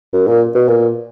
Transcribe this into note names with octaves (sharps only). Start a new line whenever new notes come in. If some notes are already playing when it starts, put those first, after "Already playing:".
F#2
A#2
B2
A#2